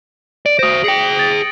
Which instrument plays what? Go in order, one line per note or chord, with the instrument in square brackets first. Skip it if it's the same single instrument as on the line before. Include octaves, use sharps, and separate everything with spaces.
[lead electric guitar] D5 [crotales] D7
[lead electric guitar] F#4 C5 [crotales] D#6 A#6
[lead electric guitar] G#4 G5 [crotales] A#6 C#7 F#7
[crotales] A6